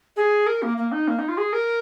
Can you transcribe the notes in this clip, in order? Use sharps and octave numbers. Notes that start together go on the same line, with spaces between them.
G#4
A#4
A#3
A#3
D#4
A#3
D#4
F4
G#4
A#4